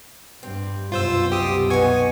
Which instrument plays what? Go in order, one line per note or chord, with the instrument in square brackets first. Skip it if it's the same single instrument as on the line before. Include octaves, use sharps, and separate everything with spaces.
[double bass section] G2 [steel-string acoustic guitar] C4
[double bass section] C2 F#2 B2 [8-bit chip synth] F4 C5 E6
[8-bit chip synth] G4 D#6
[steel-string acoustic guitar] B3 D#4 [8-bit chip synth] G#5 C#6